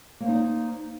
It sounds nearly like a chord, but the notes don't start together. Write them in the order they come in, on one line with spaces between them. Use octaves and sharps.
A#3 C5 D#4 D5